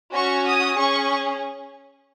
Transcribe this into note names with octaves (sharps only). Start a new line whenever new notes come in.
C#4 F#4 C#6
D#6
C#4 G#4 C#6